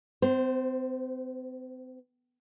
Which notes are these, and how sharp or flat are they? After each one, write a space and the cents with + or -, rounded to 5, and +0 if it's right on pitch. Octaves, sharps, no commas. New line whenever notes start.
C4 -40 C5 +0